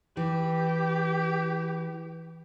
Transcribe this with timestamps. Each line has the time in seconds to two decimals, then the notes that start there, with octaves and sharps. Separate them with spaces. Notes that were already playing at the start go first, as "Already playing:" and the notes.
0.17 E3 G4